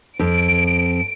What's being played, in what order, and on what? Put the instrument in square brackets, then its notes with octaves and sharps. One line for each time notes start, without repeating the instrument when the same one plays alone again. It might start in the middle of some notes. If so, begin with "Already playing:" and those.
[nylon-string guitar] F2 [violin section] D7